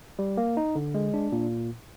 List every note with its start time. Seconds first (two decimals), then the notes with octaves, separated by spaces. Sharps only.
0.19 G3
0.37 A#3
0.57 D#4
0.75 D3
0.94 G#3
1.14 D4
1.32 A#2